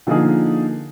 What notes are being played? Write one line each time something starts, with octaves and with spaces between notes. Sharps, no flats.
D3 F3 A#3 D#4 G#4